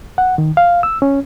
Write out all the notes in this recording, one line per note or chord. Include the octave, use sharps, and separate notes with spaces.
F#5
D#3
F5
E6
C#4